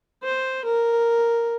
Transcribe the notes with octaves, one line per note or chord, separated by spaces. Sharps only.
C5
A#4